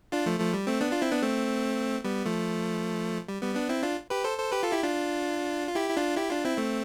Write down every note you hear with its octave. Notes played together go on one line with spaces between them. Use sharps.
D4 F4
F3 A3
F3 A3
G3
A3 C4
B3 D4
D4 F4
C4 E4
B3 D4
A3 C4
G3 B3
F3 A3
G3
G3 B3
B3 D4
C4 E4
D4 F4
G4 B4
A4 C5
A4 C5
G4 B4
F4 A4
E4 G4
D4 F4
F4
E4 G4
E4
D4 F4
E4 G4
D4 F4
C4 E4
A3 C4